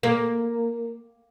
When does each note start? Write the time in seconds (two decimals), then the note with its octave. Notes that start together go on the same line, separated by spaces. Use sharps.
0.03 A#3